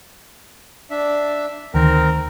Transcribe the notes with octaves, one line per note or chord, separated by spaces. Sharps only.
D4 E5
D2 D#3 C4 A#4